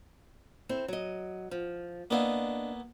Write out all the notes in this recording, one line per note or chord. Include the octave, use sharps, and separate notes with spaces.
C4 E4 A4
F#3 D#5
F3
A#3 B3 D4 E4 D#5 F5